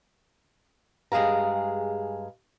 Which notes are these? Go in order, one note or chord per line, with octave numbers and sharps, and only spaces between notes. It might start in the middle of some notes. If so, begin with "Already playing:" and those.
G2 G#3 G#4 F5 A#5